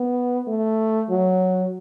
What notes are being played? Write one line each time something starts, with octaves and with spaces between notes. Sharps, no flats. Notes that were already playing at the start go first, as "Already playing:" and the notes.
Already playing: B3
A3
F#3